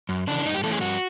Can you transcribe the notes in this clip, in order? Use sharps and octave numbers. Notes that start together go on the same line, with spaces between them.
F#2
C#3 E3 D4
G2 D#4
G4
E3 A3 C#4 A4
G#4
G2 F#4